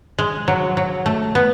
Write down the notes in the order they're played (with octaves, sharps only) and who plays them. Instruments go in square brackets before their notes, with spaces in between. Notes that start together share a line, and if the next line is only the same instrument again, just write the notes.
[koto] G#3
F#3
F#3
A3
B3